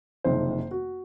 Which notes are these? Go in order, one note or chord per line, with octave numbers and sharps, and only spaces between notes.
F#1 F2 C3 D#3 C5
F#4